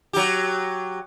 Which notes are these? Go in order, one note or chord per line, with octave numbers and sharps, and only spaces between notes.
F#3 G4